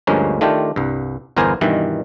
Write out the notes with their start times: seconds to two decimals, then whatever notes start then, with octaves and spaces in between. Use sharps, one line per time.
0.07 D2 G2 F3 G#3 A#3 C#4
0.41 D#3 A3 D4 F4 G4
0.76 C2 G2
1.37 G1 E2 B3 A#4 C5 G#5
1.61 G2 B2 D#3 E3